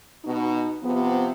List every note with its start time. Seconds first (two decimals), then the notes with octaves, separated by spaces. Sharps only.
0.25 B2 D#4
0.82 C3 F3 B3